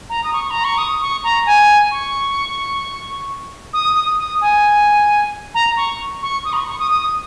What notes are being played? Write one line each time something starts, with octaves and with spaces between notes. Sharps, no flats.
A#5
D#6
C#6
A#5
C#6
D#6
C#6
A#5
G#5
C#6
D#6
D#6
D#6
G#5
A#5
C#6
C#6
D#6
A#5
C#6
C#6
D#6
D#6